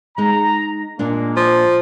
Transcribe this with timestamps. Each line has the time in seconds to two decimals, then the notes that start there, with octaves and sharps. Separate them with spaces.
0.18 G#3 D#4 A#5
0.99 A#2 G#3 A#3 D4
1.37 F3